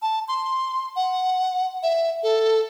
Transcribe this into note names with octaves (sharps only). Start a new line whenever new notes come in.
A5
C6
F#5
E5
A4